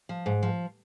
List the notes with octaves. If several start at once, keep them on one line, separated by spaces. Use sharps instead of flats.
F3
G#2
F3